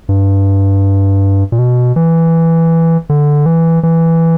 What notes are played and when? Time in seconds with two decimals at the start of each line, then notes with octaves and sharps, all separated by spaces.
0.09 G2
1.52 A#2
1.59 B2
1.96 E3
3.10 D3
3.46 E3
3.83 E3